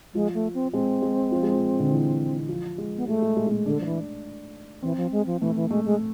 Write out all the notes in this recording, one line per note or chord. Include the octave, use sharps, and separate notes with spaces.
F3 G#3
A3
C4
G#3 C4
G#3
F3
G#3
F3
D3
E3
F3
G#3
B3
G#3 A3
G#3
G#3
G#3
A3
D3 D4
F3
E3
E3 C4
F3
G#3
F3
E3 A3
E3
G#3 A3
G#3